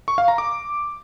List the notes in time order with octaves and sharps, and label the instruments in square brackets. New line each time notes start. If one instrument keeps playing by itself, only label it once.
[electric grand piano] C#6
F5
A#5
D6